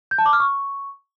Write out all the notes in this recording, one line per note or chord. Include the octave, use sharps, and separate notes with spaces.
G6
A5
D6
F6
C#6